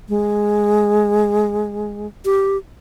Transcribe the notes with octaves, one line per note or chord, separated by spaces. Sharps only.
G#3
G4